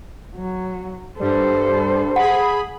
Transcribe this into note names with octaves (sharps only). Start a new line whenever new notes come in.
F#3
G2 G3 A4 C5
G#4 F#5 B5